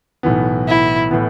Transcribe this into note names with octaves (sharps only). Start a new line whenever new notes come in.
B1 A2 E3 B3
E4
A2 E3 B3